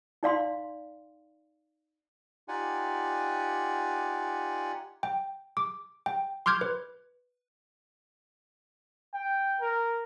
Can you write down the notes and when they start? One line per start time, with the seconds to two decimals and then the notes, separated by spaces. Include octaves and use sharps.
0.23 D#4 D5 F5 C6
2.48 D#4 F4 G4 D5 F#5 G#5
5.03 G5
5.57 D6
6.06 G5
6.46 C6 D6 F6 G6 G#6
6.61 B4
9.14 G5
9.60 A#4